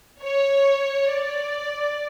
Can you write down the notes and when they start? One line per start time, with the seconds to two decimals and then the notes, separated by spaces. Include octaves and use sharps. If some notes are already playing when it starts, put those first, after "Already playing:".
0.21 C#5
1.11 D5